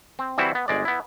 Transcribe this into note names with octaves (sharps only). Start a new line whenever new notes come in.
C4
E3 G3 C4 E4 F#4 C5
B3
G1 G#3 D5
B3 E4